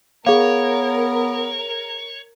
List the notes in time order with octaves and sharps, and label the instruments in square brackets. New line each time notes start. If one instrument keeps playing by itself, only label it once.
[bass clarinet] B3 [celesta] G#4 F5 [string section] A#4 [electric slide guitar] C#5